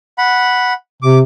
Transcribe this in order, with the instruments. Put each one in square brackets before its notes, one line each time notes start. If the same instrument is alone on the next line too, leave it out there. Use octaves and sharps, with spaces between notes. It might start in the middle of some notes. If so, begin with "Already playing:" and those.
[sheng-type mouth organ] F#5 B5
[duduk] C3 [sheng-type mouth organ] D6